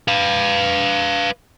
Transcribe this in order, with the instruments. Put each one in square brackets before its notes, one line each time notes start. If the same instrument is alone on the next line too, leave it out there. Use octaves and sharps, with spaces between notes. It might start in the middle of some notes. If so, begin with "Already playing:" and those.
[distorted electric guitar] B4 F5